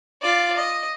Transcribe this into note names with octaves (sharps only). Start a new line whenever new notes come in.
F4 D5
D#5